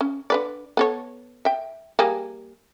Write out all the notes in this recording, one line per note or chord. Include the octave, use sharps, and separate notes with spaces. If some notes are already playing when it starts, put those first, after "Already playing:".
C#4
D3 B4 D5
B3 A4 C#5
E5 G5
G3 A#3 G#4